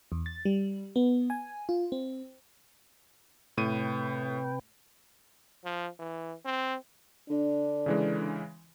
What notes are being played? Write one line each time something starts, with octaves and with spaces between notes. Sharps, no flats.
E2
A6
G3
B3
G#5
F4
C4
A2 C3 B4 G5 D#7
F3
E3
C4
D3 D4
C#3 E3 G#3